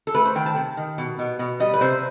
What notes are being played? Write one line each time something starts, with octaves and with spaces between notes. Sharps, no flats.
A4
A3 B4
C5
D#3 G5
A5
C3
D#3
B2
B2
B2
G3 D#5
B4
C3 C5